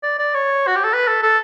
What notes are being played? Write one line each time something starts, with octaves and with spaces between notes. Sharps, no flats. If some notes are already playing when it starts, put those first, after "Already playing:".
D5
D5
C#5
F#4
G4
A4
B4
A4
A4